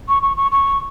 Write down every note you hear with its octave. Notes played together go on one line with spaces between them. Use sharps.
C#6
C#6
C#6
C#6